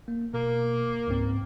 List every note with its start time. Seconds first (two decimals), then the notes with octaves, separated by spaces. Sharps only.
0.08 A#3
0.34 B2 A#3
1.08 C#2 G#2 C4